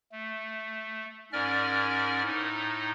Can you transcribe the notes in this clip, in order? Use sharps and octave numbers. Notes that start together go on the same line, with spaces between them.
A3
G#2 C#4 A#4 D5 F6
A2 D#4